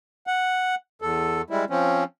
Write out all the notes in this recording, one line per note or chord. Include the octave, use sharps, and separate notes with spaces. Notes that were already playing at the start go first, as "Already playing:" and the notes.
F#5
E2 A4
G3 G#3 E4
F3 C4 C#4